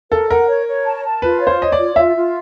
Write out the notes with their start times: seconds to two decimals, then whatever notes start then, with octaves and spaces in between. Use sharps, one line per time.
0.11 A4 A#4
0.30 A#4 F#5
0.49 C#5
0.67 C#5
0.86 A5
1.04 A5
1.22 F4 B4
1.41 C#5
1.47 C5
1.59 C#5 D#5
1.72 D5
1.78 F4
1.96 F4 E5
2.15 F4